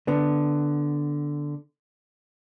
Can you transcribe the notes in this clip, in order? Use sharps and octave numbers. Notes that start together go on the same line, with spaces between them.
D3 B3